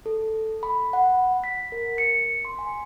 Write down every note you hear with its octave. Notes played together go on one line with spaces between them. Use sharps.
A4
B5
F#5
B6
A#4
C#7
C6
G#5